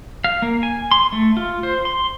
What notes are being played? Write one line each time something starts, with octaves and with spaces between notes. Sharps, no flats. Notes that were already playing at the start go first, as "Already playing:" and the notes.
F5
A#3
G#5
C6
A3
F4
C5
C6